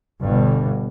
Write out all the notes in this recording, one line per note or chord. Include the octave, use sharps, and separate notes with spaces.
G1 G2 B2